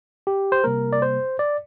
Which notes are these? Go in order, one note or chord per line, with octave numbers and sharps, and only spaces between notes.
G4
C5
C3 G3 A#3 A#4
D5
C5
D5